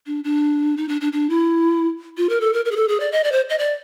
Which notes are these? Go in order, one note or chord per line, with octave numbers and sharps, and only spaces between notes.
D4
D4
D#4
D4
D4
D4
E4
F4
A#4
A4
A#4
A#4
G#4
A4
G#4
D5
D#5
D5
C5
D#5
D5